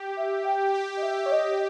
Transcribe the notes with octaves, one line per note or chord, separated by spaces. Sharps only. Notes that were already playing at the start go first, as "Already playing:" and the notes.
Already playing: G4
E5
G5
G4
D#5
E5
C#5
D#5